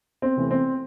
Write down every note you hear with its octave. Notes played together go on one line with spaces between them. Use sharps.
C4
C3 E3 A3
C4